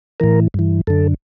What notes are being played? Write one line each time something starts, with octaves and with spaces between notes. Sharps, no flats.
A2 E3 A#4
G2 E3
F#2 D3 A4